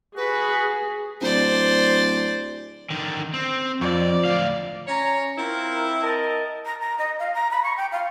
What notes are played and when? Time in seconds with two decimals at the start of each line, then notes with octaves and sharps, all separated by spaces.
0.17 F#4 G#4 B4
1.21 D1 C5 D5
2.90 D3 D#3
3.34 C4
3.81 F2 F3 D5
4.25 D2 F5
4.87 C#4 C#5 A#5
5.38 C4 E4 F4 A#4
6.01 A#4 D#5 A5
6.65 A#5
6.81 A#5
6.98 D#5
7.19 F5
7.34 A#5
7.51 B5
7.63 C#6
7.77 G5
7.92 F5